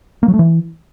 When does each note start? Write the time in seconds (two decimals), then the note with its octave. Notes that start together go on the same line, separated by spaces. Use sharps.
0.23 A#3
0.28 F#3
0.34 A3
0.39 E3